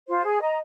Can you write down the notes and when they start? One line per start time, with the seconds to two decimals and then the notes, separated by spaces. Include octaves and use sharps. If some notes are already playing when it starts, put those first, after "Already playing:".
0.08 F4 C5
0.25 G#4
0.41 D#5 A#5